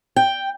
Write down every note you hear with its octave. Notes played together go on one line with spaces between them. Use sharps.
G5